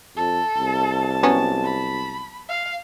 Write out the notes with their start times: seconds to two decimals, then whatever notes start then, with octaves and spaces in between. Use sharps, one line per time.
0.17 F2 A4
0.57 C2 A5
1.23 F#3 B3 C#4
1.64 B5
2.49 F5